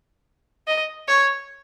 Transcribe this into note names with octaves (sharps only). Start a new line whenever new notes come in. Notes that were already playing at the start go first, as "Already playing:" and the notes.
D#5
C#5